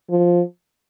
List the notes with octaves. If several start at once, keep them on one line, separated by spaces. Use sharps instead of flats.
F3